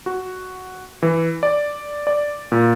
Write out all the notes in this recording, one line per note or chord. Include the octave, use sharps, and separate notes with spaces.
F#4
E3
D5
D5
A#2